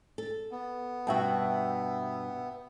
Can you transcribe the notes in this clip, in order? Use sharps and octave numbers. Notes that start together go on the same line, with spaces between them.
A4
B3
G2 B2 F#4 E5 G5 A5